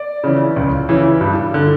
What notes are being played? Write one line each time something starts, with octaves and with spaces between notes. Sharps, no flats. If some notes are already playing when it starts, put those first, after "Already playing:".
Already playing: D5
C#3 E3
C#2
C#3 E3
G2
D3